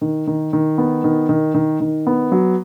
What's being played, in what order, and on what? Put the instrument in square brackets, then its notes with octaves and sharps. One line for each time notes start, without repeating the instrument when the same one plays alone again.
[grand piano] D#3
D#3
D#3
B3
D#3
D#3
D#3
D#3
B3
F#3